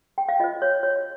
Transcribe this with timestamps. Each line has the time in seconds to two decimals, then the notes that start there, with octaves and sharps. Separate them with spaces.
0.18 G5
0.29 F5
0.40 F4 C5 D#5
0.62 C#5
0.83 C#5